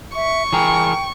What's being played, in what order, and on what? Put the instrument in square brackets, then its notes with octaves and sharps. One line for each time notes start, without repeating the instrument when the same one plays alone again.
[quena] E5 [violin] C#6
[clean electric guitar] E3 G#4 A#4 [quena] G5